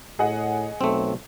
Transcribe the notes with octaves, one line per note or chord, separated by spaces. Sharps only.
A2 G#4 D#5 F#5
B1 A3 C4